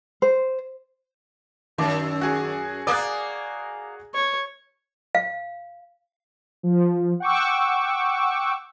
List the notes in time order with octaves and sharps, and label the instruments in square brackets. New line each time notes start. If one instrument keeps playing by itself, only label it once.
[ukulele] C5
[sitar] F#2 [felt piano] D#3 D6
[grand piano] F#4 G#4 G#5
[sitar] A#3 D5 [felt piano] D#6 F#6
[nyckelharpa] C#5
[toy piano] F5
[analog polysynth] F3
F#5 G5 C#6 D6 E6